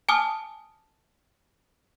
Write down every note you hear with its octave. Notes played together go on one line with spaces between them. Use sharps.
G#5 A5 D6 D#6 F6